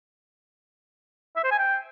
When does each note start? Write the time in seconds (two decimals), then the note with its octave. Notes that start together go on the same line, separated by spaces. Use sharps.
1.36 E5
1.44 C5
1.51 G#5
1.59 G5